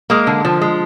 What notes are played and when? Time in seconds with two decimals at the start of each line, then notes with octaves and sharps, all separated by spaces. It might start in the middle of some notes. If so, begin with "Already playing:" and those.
0.10 G#3 A#3
0.27 D3
0.45 F3
0.61 G#3